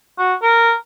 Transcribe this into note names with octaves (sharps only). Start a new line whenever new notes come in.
F#4
A#4